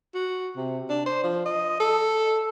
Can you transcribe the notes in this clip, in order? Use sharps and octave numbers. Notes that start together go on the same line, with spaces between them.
F#4
C3
D4
C5
F3
D#5
A4